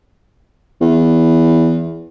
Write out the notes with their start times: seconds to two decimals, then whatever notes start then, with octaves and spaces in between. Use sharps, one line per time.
0.81 E2